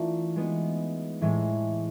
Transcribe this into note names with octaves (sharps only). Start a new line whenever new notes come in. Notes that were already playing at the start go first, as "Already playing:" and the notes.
Already playing: E3 A3 D4 F4 A#4
G#3 B3 D#4
A2 E3 G#3